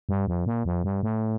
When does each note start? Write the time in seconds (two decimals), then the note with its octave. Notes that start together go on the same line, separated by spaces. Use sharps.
0.09 G2
0.28 F2
0.46 A#2
0.65 F2
0.84 G2
1.03 A2